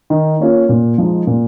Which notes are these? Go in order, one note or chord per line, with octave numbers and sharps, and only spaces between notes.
D#3
A#3 C#4 F4
A#2
F3 G#3 D#4
A#2